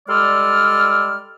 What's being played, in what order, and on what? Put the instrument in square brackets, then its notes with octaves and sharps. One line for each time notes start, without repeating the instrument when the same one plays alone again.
[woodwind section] G3 G#3 A4 D5 F6